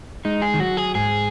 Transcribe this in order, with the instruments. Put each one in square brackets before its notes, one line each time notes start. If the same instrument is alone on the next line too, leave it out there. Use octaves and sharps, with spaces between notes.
[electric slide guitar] G#3 [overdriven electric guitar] D#4
[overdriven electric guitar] G#4
[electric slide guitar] D#3
[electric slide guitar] F#3 [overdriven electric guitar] F#4
[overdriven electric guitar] G#4
[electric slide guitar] G#2 [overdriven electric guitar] G#4